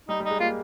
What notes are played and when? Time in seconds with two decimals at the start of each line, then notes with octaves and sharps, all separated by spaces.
0.09 G3 D#4
0.20 G3
0.25 D#4
0.30 G#3
0.40 A#3 F4